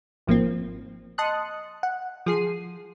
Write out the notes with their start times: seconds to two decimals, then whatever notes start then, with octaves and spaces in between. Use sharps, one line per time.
0.27 G#1 F3 A#3 C4
1.18 D#5 A5 C6 D#6 F#6 C#7
1.83 F#5
2.26 F3 G#4 C7 D#7